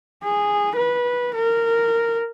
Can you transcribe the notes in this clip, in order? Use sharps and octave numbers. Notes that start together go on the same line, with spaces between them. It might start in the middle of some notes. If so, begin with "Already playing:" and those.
G#4
B4
A#4